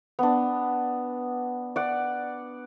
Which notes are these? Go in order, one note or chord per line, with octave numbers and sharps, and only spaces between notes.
B3 D4
D5 F#5